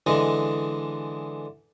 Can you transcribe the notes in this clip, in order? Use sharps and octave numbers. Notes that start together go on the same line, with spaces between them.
D3 E3 G#3 D#5